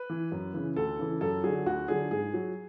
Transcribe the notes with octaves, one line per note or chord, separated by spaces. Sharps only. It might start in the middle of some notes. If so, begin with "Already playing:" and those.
Already playing: B4
E3
F#2
C#3 E3
D2 A4
C#3 E3
F#2 A4
D3 F#3 G#4
D2 F#4
D3 F#3 G#4
G#2 G#4
F#3